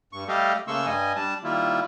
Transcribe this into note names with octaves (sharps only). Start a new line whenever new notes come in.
G2 C#6
G3 A3 G4 A4 D#5 F5
C#3 A3 A#3 C6 C#6 E6
G2 G3 D#5 G#5
G3 D4 A5
D#3 G3 A#3 E4 F4